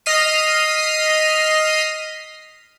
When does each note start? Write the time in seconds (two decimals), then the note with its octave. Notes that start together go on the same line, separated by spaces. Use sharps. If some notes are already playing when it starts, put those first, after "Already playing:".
0.06 D#5 F6 B6 C7 D#7